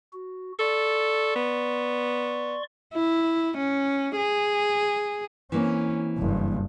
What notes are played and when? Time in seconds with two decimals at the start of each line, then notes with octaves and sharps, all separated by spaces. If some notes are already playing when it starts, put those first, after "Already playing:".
0.13 F#4
0.59 A4 D5 C6 C#6
1.36 B3
2.94 E4
3.57 C#4
4.16 G#4
5.52 E3 A#3 C4 C#4
6.18 F#1 G2